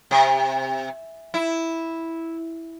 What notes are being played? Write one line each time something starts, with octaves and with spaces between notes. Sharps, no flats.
C3
E4